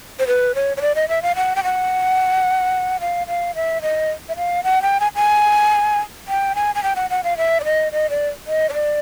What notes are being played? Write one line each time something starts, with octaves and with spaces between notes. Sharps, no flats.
C5
B4
C#5
C#5
D5
D#5
E5
F5
F#5
G5
F#5
F5
F5
E5
D#5
E5
F5
F#5
G5
G#5
G#5
G5
G#5
G#5
G5
F#5
F#5
F5
E5
D5
D#5
D#5
D5
D#5
C#5
D5